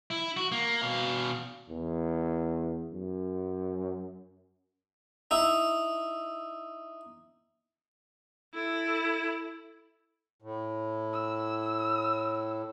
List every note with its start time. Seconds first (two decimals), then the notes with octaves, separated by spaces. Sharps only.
0.10 E4
0.37 F#4
0.52 A#3
0.81 B2 F5
1.69 E2
2.93 F#2
5.31 D#4 E4
8.54 E4 A4
10.42 A2
11.13 E6